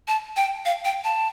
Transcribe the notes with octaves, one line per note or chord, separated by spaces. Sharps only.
A5
G5
F5
G5
A5